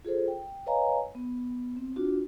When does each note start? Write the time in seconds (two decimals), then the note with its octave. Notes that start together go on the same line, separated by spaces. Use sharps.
0.05 F4 G#4 A4 C5
0.28 G5
0.66 B4 C#5 D#5 F5 G#5 A#5
1.15 B3
1.76 C4
1.96 D4 F4 F#4